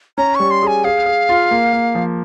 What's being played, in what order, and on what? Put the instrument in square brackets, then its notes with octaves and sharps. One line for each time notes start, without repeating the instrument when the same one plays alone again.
[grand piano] C#4 [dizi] A#5
[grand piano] G3 [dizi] C#6
[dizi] C6
[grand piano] G#4 [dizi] G#5
[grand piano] G#4 [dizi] F5
[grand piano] G#4
F4
A#3
A#3
F3